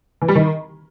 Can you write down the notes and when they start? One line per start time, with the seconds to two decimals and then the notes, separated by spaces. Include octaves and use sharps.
0.22 E3
0.28 G3
0.35 D#3